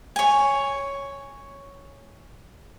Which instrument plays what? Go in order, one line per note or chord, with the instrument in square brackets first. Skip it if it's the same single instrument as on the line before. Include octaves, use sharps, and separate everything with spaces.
[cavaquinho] C#5 G#5